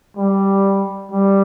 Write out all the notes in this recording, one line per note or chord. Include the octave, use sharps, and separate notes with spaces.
G3
G3